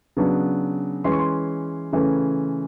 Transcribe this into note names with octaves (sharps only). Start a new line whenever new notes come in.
C#3 F#3 B3 D4
E3 G#3 C#4 C6
C#6
C6
C#3 E3 A3 C#4